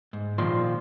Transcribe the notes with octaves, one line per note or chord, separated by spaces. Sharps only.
G#2
A#2 D#3 F3 C6